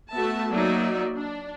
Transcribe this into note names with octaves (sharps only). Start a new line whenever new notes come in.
A3 B3 F#4 E5 A5
F#3 A#3 D#4 D5 E5
D4